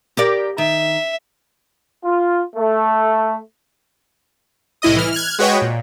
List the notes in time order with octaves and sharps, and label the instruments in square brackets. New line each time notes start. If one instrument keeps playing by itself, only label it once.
[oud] G4 A#4 D5
[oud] D#3 [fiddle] E5
[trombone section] F4
A3
[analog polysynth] C2 A2 E4 D#5 D#6
E3 F6
F6 F#6 G#6
G#3 F#4 B4 C#5 D#5 G5
A#2